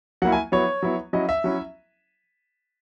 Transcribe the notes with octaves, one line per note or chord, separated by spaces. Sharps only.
F#3 A#3 E4 F#5
G#5
F#3 B3 E4 C#5
F#3 B3 E4
F#3 C#4 E4 D#5
E5
F#3 C#4 E4